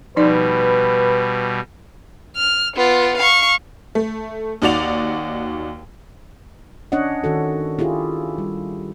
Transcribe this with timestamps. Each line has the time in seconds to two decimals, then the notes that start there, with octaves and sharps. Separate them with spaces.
0.16 B2 F3 G3 D#4 B4 D5
2.37 F6
2.76 B3 F4
3.18 F5 C#6
3.95 A3
4.62 D#2 D#4 F#4 D5 F7
6.92 C#4 D4 C#5 D#5 F#5
7.24 D#3 F#4 A4
7.79 E4 F4 G4 G#4
8.38 G3